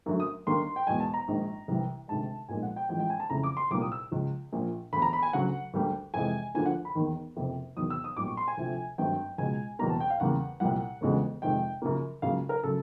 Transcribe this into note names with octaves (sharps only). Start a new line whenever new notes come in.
F#2 D3 F#3 A3
D#6
D#2 D3 G3 A#3 C6
G5
E1 E2 B2 G#3 G#5
A5
A#5
A#1 G#2 D#3 G#3
C2 C3 E3 G3
D2 C3 D#3 G#3 A5
B1 A#2 F3 G#3 G#5
F#5
G5
A1 A2 F3 G#3 G5
G5
G#5
A5
F2 C#3 E3 A3 A#5
D6
C6
C2 A#2 G3 A#3 D6
D#6
E6
C#2 C#3 F3
A#1 A#2 F3
E1 D2 D3 B5
A#5
B5
G#5
D2 C#3 F#3 F#5
D2 D3 G3 A#3
F2 C3 E3 G#3 G#5
D2 D3 F3 A#3 G#5
F#5
B5
E1 D#2 D#3
F#1 F2 C3
E1 E2 C3 D#3 F#3 D#6
E6
D#6
B1 A#2 G3 D6
C#6
C6
G#5
D2 C3 F3 A3
G#1 G2 D#3 F#3 A3 G5
C#2 B2 G#3 G#5
F#1 E2 B2 G3 A#3 A#5
A5
G5
F5
E2 C#3 E3 G3 A#3 F#5
C2 A#2 G3 F#5
E1 D2 C#3 F3 G#3
F2 C3 D#3 G#3 G5
F#2 C#3 F3 A#3
C#2 C#3 F#3 A#3 F5
A#4
C#3 F#3 A3 A4